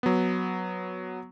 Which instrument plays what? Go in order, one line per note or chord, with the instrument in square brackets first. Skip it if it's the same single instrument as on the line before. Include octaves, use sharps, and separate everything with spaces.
[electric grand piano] F#3 B3